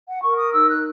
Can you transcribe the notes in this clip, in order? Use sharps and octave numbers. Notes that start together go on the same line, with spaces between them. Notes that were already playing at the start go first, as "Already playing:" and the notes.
F#5
A#4 C#6
D#6
D#4 E6
F#6